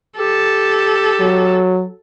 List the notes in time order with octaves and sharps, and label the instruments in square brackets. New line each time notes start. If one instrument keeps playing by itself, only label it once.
[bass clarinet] G4 [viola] A4
[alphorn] F#3